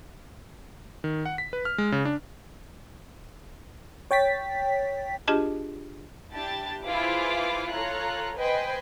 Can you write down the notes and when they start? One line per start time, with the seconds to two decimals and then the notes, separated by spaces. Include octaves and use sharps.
1.04 D#3
1.26 F#5
1.38 B6
1.53 B4
1.65 F6
1.78 G#3
1.92 C#3
2.05 D4
4.11 C#5 G5 A6 B6
5.28 D4 F4 G4 G#4 D#5 A5
6.32 D4 E4 G4 A5 A6
6.84 E4 F4 G#4 B4 C5 D6
7.70 F4 A4 C#5 A#5 F#6
8.37 B4 C5 D#5 G5 G#5